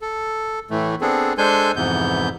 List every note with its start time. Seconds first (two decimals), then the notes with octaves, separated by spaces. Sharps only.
0.02 A4
0.71 A2 E3 A3
1.01 B3 C4 D4 G#4 A4
1.38 G#3 D4 A4 C5 G#5 G6
1.76 F2 G#2 C3 E3 B3 G6